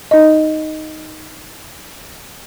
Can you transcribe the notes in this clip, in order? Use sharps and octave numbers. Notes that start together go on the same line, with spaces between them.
D#4 D#5